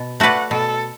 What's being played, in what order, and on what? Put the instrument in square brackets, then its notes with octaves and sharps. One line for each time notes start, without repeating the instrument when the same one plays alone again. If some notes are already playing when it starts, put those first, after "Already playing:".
Already playing: [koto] B2
[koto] A3 F#4 B4 D5 [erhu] F#5
[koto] B2 [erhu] A4